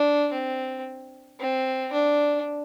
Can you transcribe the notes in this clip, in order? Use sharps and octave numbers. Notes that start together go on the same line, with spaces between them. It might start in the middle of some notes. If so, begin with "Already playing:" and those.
Already playing: D4
C4
C4
D4